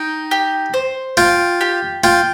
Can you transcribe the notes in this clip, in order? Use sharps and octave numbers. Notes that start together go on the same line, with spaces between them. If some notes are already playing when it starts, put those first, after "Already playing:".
Already playing: D#4 G5
G4
C5
F4 G5
G4
F4 G5